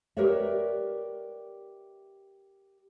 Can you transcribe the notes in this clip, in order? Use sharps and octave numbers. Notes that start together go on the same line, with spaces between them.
G4 A#4 B4 C#5 D5 E5